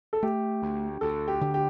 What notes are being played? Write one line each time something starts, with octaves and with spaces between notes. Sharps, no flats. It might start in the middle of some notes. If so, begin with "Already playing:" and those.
A4
A3 G4
D2
D2 A4
G4
D3
G4